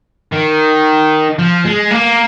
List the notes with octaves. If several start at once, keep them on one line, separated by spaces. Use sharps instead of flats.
D#3
F3
G#3
A#3